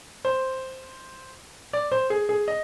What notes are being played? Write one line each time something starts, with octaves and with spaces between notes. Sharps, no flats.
C5
D5
C5
G#4
G#4
D#5